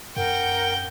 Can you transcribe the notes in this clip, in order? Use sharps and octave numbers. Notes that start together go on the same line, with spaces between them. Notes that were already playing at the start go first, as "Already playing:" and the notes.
F#2 A#4 F#5 G5